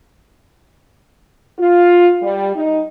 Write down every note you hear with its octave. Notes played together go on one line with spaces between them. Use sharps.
F4
G3
D#4